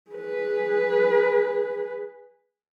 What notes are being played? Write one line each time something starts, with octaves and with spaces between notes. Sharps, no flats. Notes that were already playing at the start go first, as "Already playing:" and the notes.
G#4 B4